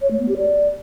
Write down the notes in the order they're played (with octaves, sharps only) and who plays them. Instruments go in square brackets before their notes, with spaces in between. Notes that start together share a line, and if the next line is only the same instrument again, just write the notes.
[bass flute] C#5
A3
B3
G4
D5